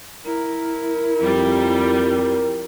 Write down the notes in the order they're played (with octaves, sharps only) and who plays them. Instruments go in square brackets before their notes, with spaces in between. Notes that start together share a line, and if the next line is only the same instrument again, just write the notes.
[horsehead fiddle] E4 [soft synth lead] A#4
[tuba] F2 [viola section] G3